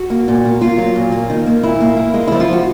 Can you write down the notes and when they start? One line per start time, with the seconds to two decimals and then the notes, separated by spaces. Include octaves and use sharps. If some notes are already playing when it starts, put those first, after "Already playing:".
Already playing: F#4
0.10 A#3
0.28 A#2
0.45 A#3
0.61 A#3 F4
0.78 F#3
0.96 A#2
1.12 A#3
1.30 D#3
1.46 A#3
1.63 A#2 E4
1.81 A#3
1.97 A#3
2.14 G#3
2.28 F3 E4
2.40 F4
2.48 F3 F#4